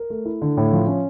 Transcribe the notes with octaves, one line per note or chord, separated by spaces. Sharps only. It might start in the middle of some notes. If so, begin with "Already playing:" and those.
Already playing: A#4
A3
E4
D3
A2
F3
C#4